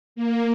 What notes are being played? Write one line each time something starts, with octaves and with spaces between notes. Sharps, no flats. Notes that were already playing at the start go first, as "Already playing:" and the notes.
A#3